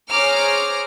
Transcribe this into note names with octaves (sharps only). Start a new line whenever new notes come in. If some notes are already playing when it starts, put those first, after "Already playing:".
G#4 C5 C#5 A#5 D6 F6